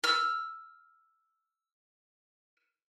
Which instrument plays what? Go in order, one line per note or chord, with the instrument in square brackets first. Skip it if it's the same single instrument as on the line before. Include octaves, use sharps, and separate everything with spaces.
[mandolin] E6 F6